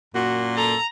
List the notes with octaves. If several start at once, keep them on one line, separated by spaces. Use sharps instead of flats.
F#2 A#2 F#4
A4 A#5